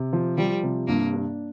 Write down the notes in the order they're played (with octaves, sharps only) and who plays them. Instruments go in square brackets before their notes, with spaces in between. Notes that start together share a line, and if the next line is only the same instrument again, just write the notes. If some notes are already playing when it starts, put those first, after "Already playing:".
Already playing: [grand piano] C3
F3
[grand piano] F3 [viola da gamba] G3
[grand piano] C3
[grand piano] G2 [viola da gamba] A#3
[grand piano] D4